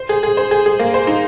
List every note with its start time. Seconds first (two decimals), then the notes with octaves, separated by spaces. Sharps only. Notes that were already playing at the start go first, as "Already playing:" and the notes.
Already playing: C5
0.09 G#4
0.23 G#4
0.37 C5
0.51 G#4
0.66 G#4
0.80 A#3
0.94 C5
1.07 D#4